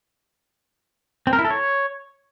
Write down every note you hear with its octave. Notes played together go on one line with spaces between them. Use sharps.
C4
A#4
E4
A4
C#5